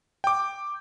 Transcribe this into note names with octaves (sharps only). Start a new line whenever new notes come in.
G5 D6